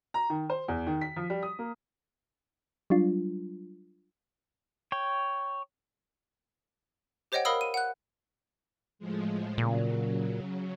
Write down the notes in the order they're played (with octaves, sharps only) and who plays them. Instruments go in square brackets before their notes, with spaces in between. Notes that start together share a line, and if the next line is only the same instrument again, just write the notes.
[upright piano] A#5
D#3
C5
E2
D#3
B6
F3
G3
D#6
A#3
[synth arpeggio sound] F#3 G3 D4 F4
[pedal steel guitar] C#5 G5
[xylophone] G4 C5 C#5 D#5 F#5 G5
A#4 D#5 F5 B5 D#6 E6
D#7
F#5 F#6
[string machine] A2 F3 G#3
[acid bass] A#2 [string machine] C#3 F#3